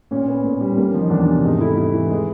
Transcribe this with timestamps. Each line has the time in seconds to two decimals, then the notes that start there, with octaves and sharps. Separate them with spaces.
0.11 A#2 C#4
0.28 B3
0.44 A#2
0.60 G3
0.77 A#3
0.94 F3
1.01 D#4
1.10 E2 D4
1.28 C3
1.44 G#2 D#4
1.60 A3 E4
1.77 G#2 E4
1.94 E3
2.10 G#3